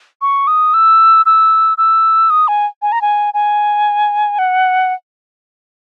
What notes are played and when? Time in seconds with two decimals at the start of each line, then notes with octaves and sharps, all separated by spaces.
0.22 C#6
0.47 D#6
0.74 E6
1.26 E6
1.78 E6
2.30 D#6
2.48 G#5
2.82 G#5
2.92 A#5
3.02 G#5
3.34 G#5
4.39 F#5